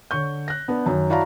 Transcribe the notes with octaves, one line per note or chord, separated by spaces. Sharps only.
D3 C#5 C#6 G6
F#6 A#6
B3 D4 B4
F#2 D#3
E4 F#4 D5 F5 A5 A#5